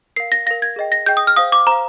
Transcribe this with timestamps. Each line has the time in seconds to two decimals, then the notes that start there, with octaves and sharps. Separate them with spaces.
0.16 A#4 F5 C7
0.32 A#6
0.46 A#4 F5 A#6
0.62 G#6
0.76 G#4 D#5 G5
0.92 A#6
1.06 G#4 D#5 G5 G6
1.17 D#6
1.27 F6
1.37 C5 F5 D#6
1.52 D6
1.67 C5 A#5
1.72 F5